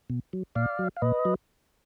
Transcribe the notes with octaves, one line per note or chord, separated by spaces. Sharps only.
B2
F#3
A#2 D5 F5
F#3
F5
A#2 B4 D#5
F#3